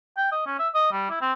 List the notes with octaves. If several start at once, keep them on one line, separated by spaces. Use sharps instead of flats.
G5
D#5
C#4
E5
D#5
G3
E4
C4